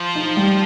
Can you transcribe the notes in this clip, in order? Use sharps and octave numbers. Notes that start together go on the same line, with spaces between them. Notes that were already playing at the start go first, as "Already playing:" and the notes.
Already playing: F3
D#4
G3